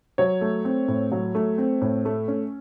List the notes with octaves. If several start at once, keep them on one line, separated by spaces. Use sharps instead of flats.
F#3 C#5
A3
C4
A2
F#3
A3
C4
A2
A3
C#4